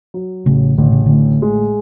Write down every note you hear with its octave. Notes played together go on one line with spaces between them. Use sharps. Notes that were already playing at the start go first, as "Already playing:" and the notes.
F#3
A1 C#3
A1 D3
C#3
A2 D3
G#3